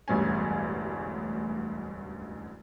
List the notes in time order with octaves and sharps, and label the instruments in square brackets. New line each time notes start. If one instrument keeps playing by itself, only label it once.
[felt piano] E1 A1 D2 G2 C#4 G#5